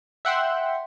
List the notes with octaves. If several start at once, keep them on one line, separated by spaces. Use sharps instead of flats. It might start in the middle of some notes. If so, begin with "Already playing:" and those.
E5 F#5 G5 C6